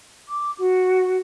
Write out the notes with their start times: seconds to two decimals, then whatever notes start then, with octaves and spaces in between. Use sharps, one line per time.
0.28 D6
0.58 F#4